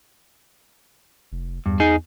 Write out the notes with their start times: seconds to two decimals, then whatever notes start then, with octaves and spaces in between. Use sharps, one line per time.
1.32 F1
1.66 E2 G2
1.80 D#4 G#4